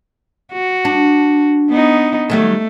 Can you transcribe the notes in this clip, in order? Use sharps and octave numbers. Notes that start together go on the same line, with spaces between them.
F#4
D4
B3 D#4
D#3 F#3 G3 A3